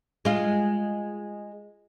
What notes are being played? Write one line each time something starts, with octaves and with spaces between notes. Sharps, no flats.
G#3 F4